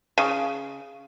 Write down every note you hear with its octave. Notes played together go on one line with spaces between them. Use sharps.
C#3